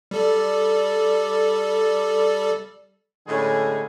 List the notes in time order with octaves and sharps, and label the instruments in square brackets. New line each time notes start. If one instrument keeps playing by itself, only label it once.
[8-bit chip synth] G3 A4 D5
[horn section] A2 D3 G3 G#3 C#4 G#4